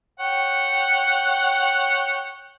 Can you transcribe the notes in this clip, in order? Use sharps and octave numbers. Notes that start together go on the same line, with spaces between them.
C#5 F#5 G5